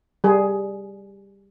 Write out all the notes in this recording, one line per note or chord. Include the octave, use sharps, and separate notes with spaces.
G3 G#4